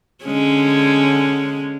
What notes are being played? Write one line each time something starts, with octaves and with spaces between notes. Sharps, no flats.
D3 G#3 C#4